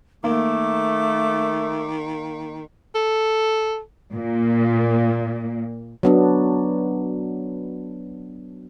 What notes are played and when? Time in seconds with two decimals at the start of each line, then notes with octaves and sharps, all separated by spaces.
0.24 D#3 A3 A#3 D6
2.95 A4
4.13 A#2 A#3
6.03 F#3 B3 D4